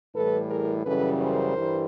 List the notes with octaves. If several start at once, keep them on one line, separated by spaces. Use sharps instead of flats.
A2 E3 G3 A4 B4
G#4 A#4
F#2 C#3 E3 G3 A4 B4
A#4 C5
G2 E3 G3